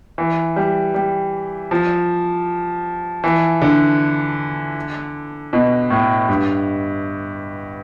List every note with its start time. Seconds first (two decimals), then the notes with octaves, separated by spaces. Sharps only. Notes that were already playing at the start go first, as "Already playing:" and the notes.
0.18 E3
0.56 G3
0.94 G3
1.71 F3
3.24 E3
3.62 D3
5.53 B2
5.90 A2
6.28 G2